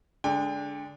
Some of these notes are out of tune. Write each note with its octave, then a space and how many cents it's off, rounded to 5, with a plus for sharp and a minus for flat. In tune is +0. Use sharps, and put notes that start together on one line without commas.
D3 -15 G#3 +0 G5 +30